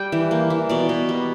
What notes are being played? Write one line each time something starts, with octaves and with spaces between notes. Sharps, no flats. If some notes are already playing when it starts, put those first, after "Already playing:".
Already playing: G3 G5
E3
A#3
E3
B2 D5
B2
G3